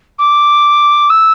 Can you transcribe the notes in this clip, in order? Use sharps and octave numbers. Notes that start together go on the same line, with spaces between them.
D6
E6